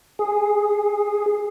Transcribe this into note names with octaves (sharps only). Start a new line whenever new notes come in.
G#4